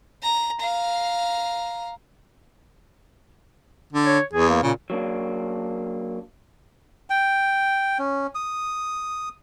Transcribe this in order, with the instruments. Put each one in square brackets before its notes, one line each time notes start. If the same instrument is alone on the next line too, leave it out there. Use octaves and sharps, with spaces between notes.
[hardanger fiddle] A#5
F5 A#5
[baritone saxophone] D3
[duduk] C#5
[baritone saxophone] E2 [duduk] G#4
[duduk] A#3
[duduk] A#2 [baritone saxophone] C#3
[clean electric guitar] F#3 A#3 D4
[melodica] G5
C#4
D#6